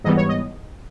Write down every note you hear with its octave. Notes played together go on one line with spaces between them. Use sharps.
G#2 E3 G3 B3 D#5
C#5
D#5